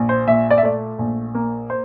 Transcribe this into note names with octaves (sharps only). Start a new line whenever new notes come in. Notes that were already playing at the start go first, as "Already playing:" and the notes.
Already playing: A#1
C5
A#2 E5
D5
E5
A3 D5
A#1
A#3
C5